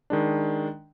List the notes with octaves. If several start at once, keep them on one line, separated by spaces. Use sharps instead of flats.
D#3 G#3 D4